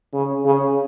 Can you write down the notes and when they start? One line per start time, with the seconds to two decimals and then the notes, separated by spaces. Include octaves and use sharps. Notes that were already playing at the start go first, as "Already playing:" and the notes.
0.14 C#3
0.45 C#3